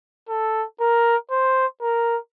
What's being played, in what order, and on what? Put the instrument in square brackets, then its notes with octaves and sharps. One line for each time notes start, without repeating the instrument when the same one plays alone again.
[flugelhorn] A4
A#4
C5
A#4